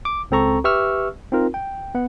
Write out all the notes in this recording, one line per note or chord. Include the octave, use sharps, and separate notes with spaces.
D6
C#2 C4 A4 A#5 C#6
G4 B4 E5 C#6 E6 F6
C4 D#4 F4 A#4
G5
B3 F#5